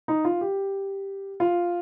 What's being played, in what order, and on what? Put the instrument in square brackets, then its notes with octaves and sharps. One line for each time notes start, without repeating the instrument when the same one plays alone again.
[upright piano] D#4
F4
G4
F4